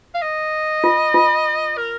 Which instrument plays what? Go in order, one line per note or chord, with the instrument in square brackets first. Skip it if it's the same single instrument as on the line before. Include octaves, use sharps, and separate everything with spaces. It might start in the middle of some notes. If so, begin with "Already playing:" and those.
[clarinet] F5
D#5
[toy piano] F4
F4
[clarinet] A#4